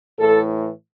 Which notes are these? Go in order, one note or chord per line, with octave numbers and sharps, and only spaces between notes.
A2 E3 A4